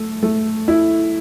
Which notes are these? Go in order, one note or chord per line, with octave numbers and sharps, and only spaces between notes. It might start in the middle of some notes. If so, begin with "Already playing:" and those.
Already playing: A3
A3
E4